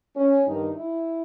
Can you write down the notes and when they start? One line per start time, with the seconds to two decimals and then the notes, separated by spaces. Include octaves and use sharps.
0.16 C#4
0.45 G2 D#3 D#4
0.74 E4